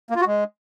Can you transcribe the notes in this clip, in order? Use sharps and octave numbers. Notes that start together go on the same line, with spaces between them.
A#3
F4
F#4
G#3